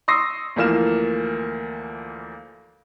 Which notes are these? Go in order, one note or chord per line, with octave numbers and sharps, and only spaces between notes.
C6 C#6 D#6 E6 A#6 C7
D2 E3 F3 A#3 F6 E7